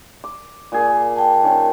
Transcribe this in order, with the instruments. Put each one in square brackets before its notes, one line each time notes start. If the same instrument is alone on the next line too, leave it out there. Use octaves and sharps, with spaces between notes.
[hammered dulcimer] D6
A#2 G#4
[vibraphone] G5 A5
[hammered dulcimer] D#3 C#4